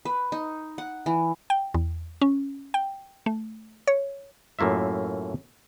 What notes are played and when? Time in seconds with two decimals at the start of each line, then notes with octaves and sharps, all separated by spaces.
0.05 B4
0.32 D#4
0.78 F#5
1.06 E3
1.50 G5
1.74 E2
2.21 C#4
2.74 G5
3.26 A3
3.87 C#5
4.59 F#2 A2 A#3 F4 E5